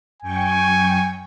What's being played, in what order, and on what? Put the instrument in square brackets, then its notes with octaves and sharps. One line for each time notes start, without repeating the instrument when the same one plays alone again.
[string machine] F#2 G5 C#6 [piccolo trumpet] G#5